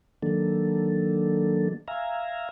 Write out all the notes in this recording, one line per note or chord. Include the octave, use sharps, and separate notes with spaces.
D#3 F#3 A#3 D4 A4
E5 F5 G#5 A#5